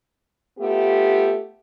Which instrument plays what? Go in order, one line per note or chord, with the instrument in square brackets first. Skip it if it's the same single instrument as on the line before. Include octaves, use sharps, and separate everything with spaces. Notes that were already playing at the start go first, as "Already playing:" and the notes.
[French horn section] A3 B3 F4 G4